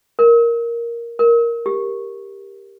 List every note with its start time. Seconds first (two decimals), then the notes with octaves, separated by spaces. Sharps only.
0.19 A#4
1.19 A#4
1.66 G4